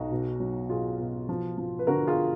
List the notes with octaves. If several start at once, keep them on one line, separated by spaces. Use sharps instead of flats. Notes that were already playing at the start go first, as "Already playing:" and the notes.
Already playing: B1 D#4 F#4
B2
F#3
B2 F4 G#4
B2
F3
F3
B4
D3 F#4 A#4
F4 G#4